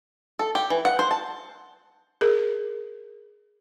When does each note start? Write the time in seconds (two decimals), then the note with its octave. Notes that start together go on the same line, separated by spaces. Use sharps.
0.39 A4
0.55 G4
0.70 E3
0.85 F#5
0.99 C5
1.11 A5
2.21 G#4 A#4